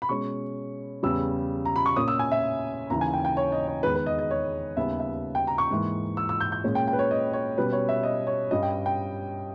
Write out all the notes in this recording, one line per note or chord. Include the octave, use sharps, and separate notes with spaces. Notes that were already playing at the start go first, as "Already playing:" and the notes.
B5
B2 G#3 C#4 C#6
E2 C#3 G3 E6
A#5
B5
C#6
A#2 A#3 C#4 D#6
E6
G#5
E5
D#2 C#3 E3 A#5
G#5
G5
G5
C#5
D#5
C#5
E2 D#3 G#3 B4
B4
D#5
D#5
C#5
D#2 C#3 G3 B3 E5
E5
G5
A#5
C#6
G#2 E3 A#3
E6
E6
G6
G6
A#2 G#3 C#4
G5
G5
B4
C#5
D#5
C#5
B2 G3 C#4 B4
C#5
E5
D#5
C#5
G2 G3 C#4 D#5
G5
G5